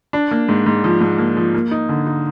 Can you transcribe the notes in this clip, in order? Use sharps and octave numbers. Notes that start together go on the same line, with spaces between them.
D4
A#3
G#2
G#2
F3
G#2
A#3
F3
A#3
D#4
D3
D#4